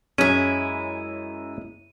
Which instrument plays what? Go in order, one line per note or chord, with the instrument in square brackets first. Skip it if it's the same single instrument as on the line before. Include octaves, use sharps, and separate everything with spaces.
[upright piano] F#2 [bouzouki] G#3 E4 [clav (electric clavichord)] C#4 G#5 [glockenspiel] D#7